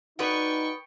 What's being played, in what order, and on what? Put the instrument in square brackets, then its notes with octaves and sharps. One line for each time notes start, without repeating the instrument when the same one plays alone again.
[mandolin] B3 D5 [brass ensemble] D#4 [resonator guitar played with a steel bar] F#4 B4 [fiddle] G5 C#6